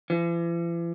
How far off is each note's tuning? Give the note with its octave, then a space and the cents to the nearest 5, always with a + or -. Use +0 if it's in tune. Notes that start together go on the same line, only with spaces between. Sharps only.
E3 +45